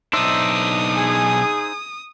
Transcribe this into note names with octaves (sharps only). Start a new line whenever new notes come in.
B1 D4 D#4 C5 E5 D#6
G#4 G#5